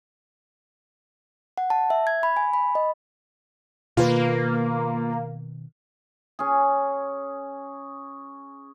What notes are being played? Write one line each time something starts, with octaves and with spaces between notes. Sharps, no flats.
F#5
A5
E5
G#6
B5
G#5
B5
D#5
B2 D#3 A#3 F4 B4
C#4 G#4